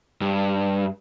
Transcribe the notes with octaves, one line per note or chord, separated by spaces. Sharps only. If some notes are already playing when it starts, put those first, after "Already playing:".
G2